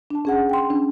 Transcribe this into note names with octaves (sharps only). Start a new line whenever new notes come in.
D4 A5
C#4 G#4 F#5
G5 C6
C#4 D4